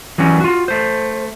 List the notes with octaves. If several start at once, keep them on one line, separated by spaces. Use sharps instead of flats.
E3 F#3 G3 C#4
F4 F#4
A3 C5